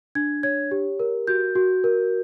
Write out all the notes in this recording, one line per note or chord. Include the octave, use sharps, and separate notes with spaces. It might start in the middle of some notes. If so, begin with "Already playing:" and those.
D4 G#6
C#5 G#6
G4
A#4
F#4 G6
F#4
A#4